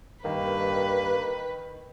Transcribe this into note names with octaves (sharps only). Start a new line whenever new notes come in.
G2 D#3 A#3 B4